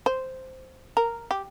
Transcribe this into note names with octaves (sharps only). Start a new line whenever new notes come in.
C5
A#4
G4